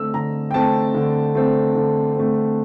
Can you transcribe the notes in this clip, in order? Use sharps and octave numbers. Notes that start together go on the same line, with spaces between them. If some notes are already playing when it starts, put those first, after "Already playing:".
Already playing: D3 A3 C4 E6
D3 A#5
G5
A3 C4 A5
D3
A3 C4
D3
A3 C4